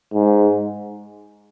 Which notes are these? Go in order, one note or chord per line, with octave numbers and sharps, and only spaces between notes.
G#2